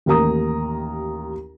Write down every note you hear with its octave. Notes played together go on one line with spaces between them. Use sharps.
A1 D#2 A#4 A#5 D#6